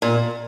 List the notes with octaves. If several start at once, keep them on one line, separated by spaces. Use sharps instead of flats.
A#2